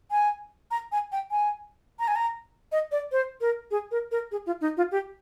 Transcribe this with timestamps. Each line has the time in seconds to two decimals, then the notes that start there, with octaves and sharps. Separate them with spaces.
0.11 G#5
0.71 A#5
0.92 G#5
1.12 G5
1.31 G#5
1.99 A#5
2.08 G#5
2.16 A#5
2.72 D#5
2.92 D5
3.12 C5
3.41 A#4
3.71 G#4
3.91 A#4
4.11 A#4
4.31 G#4
4.46 F4
4.61 D#4
4.77 F4
4.92 G4